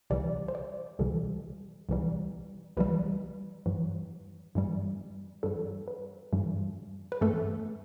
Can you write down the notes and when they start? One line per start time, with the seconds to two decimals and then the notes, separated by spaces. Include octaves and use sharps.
0.10 C2 C3 E3 G3 D5
0.48 C5
0.55 D5
0.99 C2 C3 E3 G3 A4
1.89 C2 C3 E3 G3
2.77 C2 C3 E3 G3 B4
3.66 G2 E3 G3
4.55 G2 E3 G3
5.43 G2 E3 G3 A4
5.88 B4
6.33 G2 E3 G3
7.12 B4
7.21 G2 E3 A3 A4